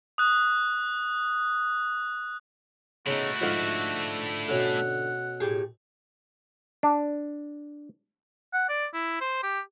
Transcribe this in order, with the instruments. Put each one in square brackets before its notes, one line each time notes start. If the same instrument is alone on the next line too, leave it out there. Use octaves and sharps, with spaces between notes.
[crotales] D#6 F#6
[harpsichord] C#3 B3 D#4 [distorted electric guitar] A3 E4 [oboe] F#4
[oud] G#2 D3 F5 [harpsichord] F3 F#5
[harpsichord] B2 C#4 A4 [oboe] F#5
[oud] A2 G4 G#4
[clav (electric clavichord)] D4
[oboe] F#5
D5
E4
C5
G4